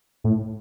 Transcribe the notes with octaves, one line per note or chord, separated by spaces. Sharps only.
A2